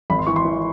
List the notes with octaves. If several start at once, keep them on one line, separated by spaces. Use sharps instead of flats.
G#1 B5
C6
E3 C#6
C6
E3